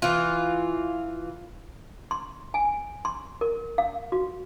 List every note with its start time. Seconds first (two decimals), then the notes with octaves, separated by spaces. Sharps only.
0.02 E3 F4
2.11 C6
2.54 G#5
3.05 C6
3.41 A#4
3.78 F5
4.12 F#4